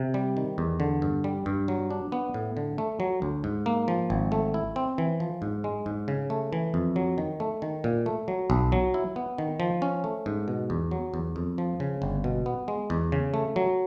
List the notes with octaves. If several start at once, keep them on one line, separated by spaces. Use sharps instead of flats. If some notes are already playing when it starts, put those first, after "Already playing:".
Already playing: C3
G3
D#3
E2
D3
G2
G3
G2
F#3
D4
B3
A2
D3
A3
F#3
D2
G#2
A#3
F3
G#1
A3
E4
C4
E3
F3
G#2
G#3
G#2
C#3
A3
E3
F2
F#3
D#3
A3
D#3
A#2
A3
F#3
B1
F#3
E4
B3
D#3
F3
C#4
A3
G#2
B2
E2
F#3
E2
F2
F3
C#3
G1
B2
B3
G#3
E2
C#3
A3
F#3